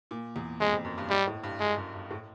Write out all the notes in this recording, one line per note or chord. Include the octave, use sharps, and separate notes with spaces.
A#2
E2
F2 G#3
F2
F#2
G2
G#2 G3
A2
G2
G2 G#3
F#2
G2
A2